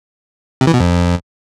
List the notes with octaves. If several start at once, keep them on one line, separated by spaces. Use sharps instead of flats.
C3
E3
B2
F2